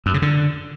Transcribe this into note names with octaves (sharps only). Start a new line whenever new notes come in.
F#2
C#3
D3